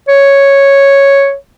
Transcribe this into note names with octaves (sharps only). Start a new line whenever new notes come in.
C#5